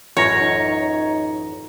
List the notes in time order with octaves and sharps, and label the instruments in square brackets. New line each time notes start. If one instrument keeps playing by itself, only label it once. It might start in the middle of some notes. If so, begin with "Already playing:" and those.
[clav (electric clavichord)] A1 F#2 [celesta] F4 A#6 [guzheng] C#5
[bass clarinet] D#4